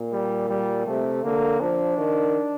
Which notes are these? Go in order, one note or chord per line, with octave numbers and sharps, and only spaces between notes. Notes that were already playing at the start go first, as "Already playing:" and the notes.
Already playing: A#2
G3
G3
C3 A3
D3 A#3
F3 D4
D#3